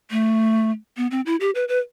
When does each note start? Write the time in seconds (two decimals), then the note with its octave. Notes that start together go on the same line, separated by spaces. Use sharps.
0.11 A3
0.97 B3
1.11 C4
1.26 E4
1.40 G4
1.55 B4
1.69 B4